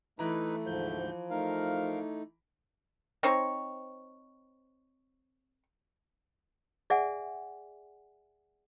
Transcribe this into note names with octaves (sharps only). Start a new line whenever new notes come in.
E3 A3 D#4 E4 B4 A#5
D2 G#2 F3 G6
A3 D#4 A#4 F5
C4 D#4 C5 C#5
G#4 D5 E5 F#5 G#5